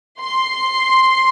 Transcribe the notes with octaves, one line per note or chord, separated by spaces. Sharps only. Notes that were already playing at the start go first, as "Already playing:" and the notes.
C6